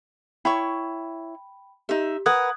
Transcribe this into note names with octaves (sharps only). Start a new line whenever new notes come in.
E4 C#5 G5 B5 C#6
D#4 G4 E5
A#4 B4 F#5 D#6 F#6 G#6